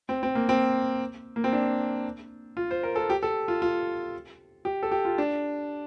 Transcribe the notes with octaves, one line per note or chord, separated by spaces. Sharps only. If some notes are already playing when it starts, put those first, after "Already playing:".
C4
C4
A#3
C4
A#3
C4
D4
F4
C5
A#4
A4
G4
A4
F4
F4
G4
A4
G4
F4
D4